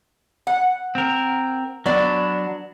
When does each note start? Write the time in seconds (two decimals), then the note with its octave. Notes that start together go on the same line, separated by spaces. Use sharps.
0.47 F#5
0.95 C4 A#4
1.86 F#3 B3 D4 D5